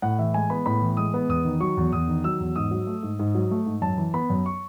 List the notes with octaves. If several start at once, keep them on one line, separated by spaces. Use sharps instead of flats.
A2 F#5
E3 E5
G#3 G#5
B3 B5
A2 B5
E3
G#3 D#6
B3
E2 D#6
D#3
F#3 C#6
E2
E2 D#6
D#3
F#3 E6
E2
G#2 D#6
F#3
A3
G#2
G#2
F#3
A3
G#2
F#2 A5
E3
B3 B5
F#2
C#6